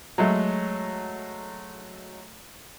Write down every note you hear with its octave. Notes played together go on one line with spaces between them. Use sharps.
F#3 G#3 A3